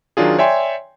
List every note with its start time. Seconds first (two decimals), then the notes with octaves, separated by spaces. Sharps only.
0.17 D#3 F#3 D4 F4 G#4
0.39 C#5 D5 E5 G5 G#5 C6